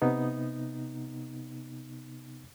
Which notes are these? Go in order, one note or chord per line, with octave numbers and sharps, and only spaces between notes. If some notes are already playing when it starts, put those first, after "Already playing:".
C3 B3 D#4